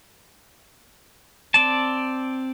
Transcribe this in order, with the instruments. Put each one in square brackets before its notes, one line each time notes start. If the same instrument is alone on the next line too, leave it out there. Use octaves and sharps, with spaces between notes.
[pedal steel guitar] C4 D5 A5